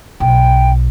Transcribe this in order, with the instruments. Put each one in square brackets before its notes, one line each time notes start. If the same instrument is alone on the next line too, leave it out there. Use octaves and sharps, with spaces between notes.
[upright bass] B1 [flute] G5